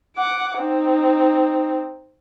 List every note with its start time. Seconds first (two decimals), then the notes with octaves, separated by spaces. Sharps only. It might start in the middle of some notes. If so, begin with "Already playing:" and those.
0.17 F#5 D6
0.59 C4 D#4